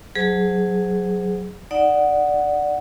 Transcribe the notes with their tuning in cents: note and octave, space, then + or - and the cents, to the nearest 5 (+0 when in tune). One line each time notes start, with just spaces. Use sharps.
F#3 +0 G#4 +0 C5 -25
D#4 +0 D5 +0 F#5 +0